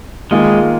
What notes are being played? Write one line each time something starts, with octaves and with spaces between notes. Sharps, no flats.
D#3 G#3 A#3 F4 G#4